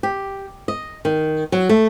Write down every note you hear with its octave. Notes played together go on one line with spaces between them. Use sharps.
G4
D#5
D#3
F#3
A3